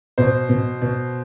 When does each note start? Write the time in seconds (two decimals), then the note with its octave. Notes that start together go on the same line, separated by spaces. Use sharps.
0.18 B2 C5
0.49 B2
0.82 B2